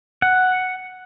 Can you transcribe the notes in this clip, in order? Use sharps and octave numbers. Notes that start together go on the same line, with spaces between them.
F#5